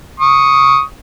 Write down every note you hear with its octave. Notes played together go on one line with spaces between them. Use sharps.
C#6 D#6